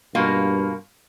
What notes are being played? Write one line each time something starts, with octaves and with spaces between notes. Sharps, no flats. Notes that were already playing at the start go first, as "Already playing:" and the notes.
G2 B2 A#3 F4